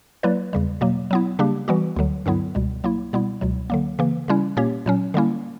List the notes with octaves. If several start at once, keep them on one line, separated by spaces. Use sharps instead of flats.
F#3 A#3 E4 B4 D5
E2 C#3 G3
B2 F#3 A#3
F#3 B3 E4
C#3 G3 A#3 D4 G4
E3 G3 B3 F#4
D2 D3 F#3
G2 D3 F#3 B3 E4
C#2 B2 G3
F#3 A#3 E4
B2 G3 B3 E4
C#2 B2 F#3
D3 F#3 A#3
C#3 E3 A#3
C#3 G3 C#4 E4
A#2 A#3 C#4 G4 C#5
A#2 F#3 C#4
D3 G3 A#3 C#4 E4